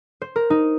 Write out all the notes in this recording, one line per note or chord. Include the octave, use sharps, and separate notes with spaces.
C5
A#4
D#4